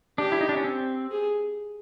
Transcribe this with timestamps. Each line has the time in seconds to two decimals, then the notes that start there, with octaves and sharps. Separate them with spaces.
0.18 D4 G4
0.32 E4
0.41 D#4
0.49 D4
0.57 C#4
0.64 C4
1.11 G#4